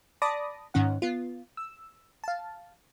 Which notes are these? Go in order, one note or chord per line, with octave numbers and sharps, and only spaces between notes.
D5 A5 B5 D6 D#6 A#6
G#2 D#3 C#4 F#5
B3 F4
E6
F5 A5